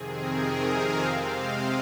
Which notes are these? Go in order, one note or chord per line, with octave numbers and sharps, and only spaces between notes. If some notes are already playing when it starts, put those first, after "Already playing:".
Already playing: F2 C3 D#3 C4 G#4
A#4
F5
C3 G#3 C4
D#5